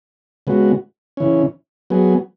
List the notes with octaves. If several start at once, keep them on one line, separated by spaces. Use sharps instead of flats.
C#3 G#3 B3 F#4
C#3 E3 C#4
F#3 B3 G#4